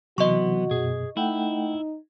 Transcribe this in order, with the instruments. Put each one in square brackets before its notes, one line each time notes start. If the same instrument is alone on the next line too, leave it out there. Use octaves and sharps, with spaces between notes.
[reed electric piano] C3 E3 [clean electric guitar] F#3 B3 C6 [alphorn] F#4 [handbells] D#5 C#6
[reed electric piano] F#2 B2 [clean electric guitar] G#4
[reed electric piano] A3 F#5 G5 [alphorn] D#4 [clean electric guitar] E4